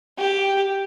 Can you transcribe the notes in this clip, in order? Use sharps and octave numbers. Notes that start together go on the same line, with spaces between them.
G4